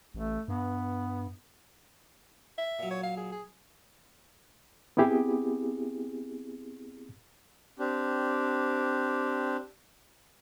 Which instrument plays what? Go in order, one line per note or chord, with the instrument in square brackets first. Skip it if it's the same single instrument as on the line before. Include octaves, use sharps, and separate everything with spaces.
[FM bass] A1 [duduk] A3
[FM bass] G2 [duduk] B3
[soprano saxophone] E5
[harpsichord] A#2 F#3
[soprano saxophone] C#5
F5
G#4
G#4
[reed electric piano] B3 C4 E4 G4 G#4
[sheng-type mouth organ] C4 D4 G4